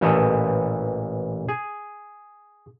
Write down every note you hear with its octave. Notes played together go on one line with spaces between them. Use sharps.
A1 A#2 E3 E4 A4 D#5
G#4